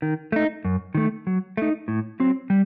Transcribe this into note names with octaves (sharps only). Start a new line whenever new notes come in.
D#3
A3 D#4
F#2
D#3 A3
F#3
A3 D#4
A2
F#3 C4
G3